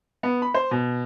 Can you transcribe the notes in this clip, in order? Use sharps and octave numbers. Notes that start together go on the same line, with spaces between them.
B3
B5
C5
B2